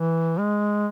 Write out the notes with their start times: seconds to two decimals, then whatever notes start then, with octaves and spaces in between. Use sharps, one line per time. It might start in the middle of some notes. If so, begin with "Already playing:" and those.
Already playing: E3
0.39 G#3